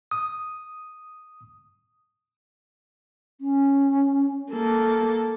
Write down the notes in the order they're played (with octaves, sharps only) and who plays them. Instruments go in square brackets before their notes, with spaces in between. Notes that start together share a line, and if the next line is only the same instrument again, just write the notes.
[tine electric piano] D#6
[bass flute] C#4
[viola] A#3 A4